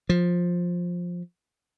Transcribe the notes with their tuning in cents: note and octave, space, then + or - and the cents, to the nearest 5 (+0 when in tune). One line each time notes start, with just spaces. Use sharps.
F3 +10